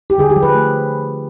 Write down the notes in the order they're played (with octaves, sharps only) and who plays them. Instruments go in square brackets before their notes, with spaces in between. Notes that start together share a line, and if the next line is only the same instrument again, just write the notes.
[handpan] G4
D3 G#4
G4
F3
B4
A3